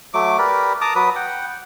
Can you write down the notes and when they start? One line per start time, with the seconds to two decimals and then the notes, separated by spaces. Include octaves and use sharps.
0.14 F#3 A3 D6
0.38 G4 A#4 B4 D5
0.81 A5 A#5 D6 D#6
0.95 F#3 B4 D#6
1.16 F#5 G5